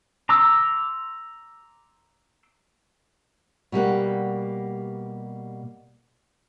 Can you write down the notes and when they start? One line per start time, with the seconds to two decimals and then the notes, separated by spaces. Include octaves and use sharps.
0.29 A#5 C6 D6 E6
3.72 B2 G3 A#3 F#5